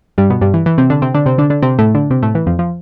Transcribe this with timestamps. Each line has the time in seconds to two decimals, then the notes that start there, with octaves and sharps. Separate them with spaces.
0.18 G2 G3
0.30 B2 B3
0.41 G2 G3
0.54 E3
0.66 E3
0.78 C3 C4
0.90 D3 D4
1.02 C3 C4
1.14 D3 D4
1.26 C3 C4
1.38 D3 D4
1.50 D3 D4
1.62 C3 C4
1.79 A2 A3
1.95 D3 D4
2.11 C3 C4
2.23 A2 A3
2.35 E3
2.46 F2 F3
2.59 F3